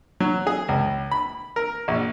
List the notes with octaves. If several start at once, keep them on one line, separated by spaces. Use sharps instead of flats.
F#3
G#4
C#2
B5
A#4
A#1